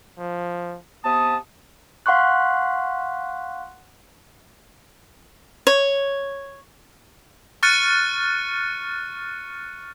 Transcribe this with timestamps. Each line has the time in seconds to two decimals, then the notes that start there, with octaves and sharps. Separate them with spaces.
0.18 F3
1.04 C3 B3 A5 D#6
2.06 F5 F#5 C6 C#6 F#6
5.67 C#5
7.63 C#6 F6 F#6 A6 C#7 D#7